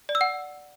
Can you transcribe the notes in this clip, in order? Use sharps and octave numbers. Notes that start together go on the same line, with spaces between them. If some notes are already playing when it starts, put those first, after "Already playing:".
D5
E6
F#5